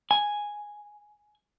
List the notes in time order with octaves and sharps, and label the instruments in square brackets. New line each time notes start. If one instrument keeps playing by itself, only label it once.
[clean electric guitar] G#5